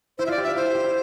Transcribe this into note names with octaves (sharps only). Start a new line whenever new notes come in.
E4 C5
F4 D5 E5
G4
F4 E5
E4 C5
G4
E4